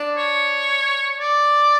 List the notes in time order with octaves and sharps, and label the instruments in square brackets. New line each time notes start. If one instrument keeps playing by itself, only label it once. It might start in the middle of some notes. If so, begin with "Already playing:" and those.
Already playing: [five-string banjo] D4
[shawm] C#5
D5